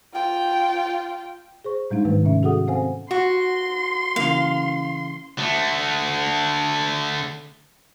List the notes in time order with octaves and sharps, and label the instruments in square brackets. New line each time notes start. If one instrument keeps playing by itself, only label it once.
[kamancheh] F4 G5
[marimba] G#4 C5 C#6
A2 G3 G#3 D4 D#4
G#2 D#3 A3 B4
C3 C#4 E5
C#4 F#4 G#4 A4 F#5 D#6
C4 C5 F5 F#5 G#5
[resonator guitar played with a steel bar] F#4 [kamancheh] C6
[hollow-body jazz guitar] C#3 E3 A#3 [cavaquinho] F5
[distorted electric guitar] D3 A3